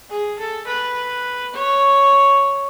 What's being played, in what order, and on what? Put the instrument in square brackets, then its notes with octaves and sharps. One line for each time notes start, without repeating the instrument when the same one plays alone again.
[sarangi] G#4
A4
B4
C#5